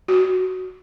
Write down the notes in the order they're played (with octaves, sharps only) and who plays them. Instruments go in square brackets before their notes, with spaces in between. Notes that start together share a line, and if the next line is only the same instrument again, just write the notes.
[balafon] F#4